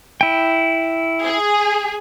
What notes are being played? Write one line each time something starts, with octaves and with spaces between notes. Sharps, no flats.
E4 G5
G#4